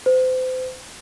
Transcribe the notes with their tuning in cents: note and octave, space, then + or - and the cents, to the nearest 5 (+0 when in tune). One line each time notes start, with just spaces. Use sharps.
C5 -35